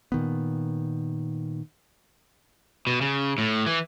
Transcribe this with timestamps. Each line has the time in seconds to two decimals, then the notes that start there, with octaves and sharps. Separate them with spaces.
0.12 A#2 D#3 B3
2.87 B2
3.01 C#3
3.38 A2
3.67 E3